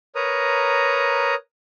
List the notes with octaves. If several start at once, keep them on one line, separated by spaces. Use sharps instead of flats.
A#4 B4 C#5 A#5 D#6